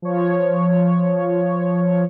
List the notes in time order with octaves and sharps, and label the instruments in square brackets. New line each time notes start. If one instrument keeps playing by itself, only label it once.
[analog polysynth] F3 C#5